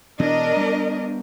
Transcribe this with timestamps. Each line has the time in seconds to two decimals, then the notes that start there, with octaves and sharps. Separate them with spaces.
0.20 B2 E3 D4 A#4 D#5
0.57 G3 B3